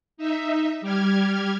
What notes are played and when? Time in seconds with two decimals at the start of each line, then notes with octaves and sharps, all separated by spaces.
0.17 D#4 E5
0.81 G3 G4 F6 G#6